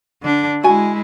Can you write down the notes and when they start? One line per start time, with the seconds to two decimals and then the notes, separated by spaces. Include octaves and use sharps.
0.22 D3 D4
0.63 G#3 E4 F#4 G#5